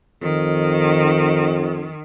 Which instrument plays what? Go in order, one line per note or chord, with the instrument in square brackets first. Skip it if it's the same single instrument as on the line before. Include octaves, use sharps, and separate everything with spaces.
[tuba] F2 [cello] D#3